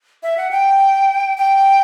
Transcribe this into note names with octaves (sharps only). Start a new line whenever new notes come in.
E5
F#5
G5
G5